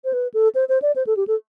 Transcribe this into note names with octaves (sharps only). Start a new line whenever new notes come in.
C5
B4
A4
C5
C5
D5
C5
A4
G4
A4